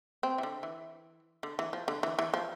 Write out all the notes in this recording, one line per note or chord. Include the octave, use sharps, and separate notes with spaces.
C4
E3
D3
E3
D3
E3
F3
D3
E3
E3
F3